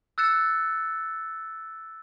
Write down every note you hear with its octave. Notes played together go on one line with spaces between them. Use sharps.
E6 F#6 A6 C#7 E7